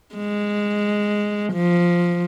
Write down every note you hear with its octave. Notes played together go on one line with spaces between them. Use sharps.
G#3
F3